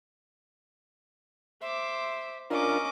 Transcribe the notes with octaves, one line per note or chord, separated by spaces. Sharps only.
C5 E5 D6
C#4 D4 F4 A#4 D#5 D6